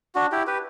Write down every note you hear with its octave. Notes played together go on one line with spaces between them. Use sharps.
D4 F#4
E4 G4
G4 B4